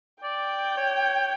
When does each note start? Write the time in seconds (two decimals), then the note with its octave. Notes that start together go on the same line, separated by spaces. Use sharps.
0.24 D5 G5
0.77 C#5